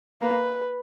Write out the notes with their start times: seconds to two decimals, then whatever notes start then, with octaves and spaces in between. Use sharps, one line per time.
0.21 A#3 B4